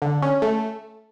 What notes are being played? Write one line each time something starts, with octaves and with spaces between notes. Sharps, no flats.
D3
C#4
A3